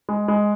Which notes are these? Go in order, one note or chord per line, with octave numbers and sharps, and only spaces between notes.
G#3
G#3